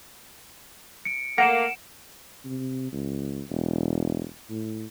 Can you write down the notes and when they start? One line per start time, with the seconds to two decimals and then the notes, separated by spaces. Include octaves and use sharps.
1.05 C#7 D7
1.38 A3 A#3 F#5 A#6 D7 E7
2.45 C3
2.93 C#2
3.50 E1
4.50 A2